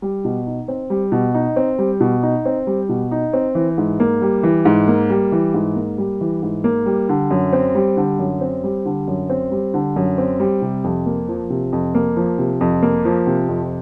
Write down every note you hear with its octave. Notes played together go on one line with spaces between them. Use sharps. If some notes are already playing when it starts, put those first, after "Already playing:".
G3
B2
D#4
C4
G3
B2
D#4
C4
G3
B2
D#4
C4
G3
B2
D#4
C4
E3
G#2
A#3
G3
E3
G#2
A#3
G3
E3
G#2
A#3
G3
E3
G#2
A#3
G3
D3
F#2
C4
G3
D3
F#2
C4
G3
D3
F#2
C4
G3
D3
F#2
C4
G3
C3
F2
A#3
F3
C3
F2
A#3
F3
C3
F2
A#3
F3
C3
F2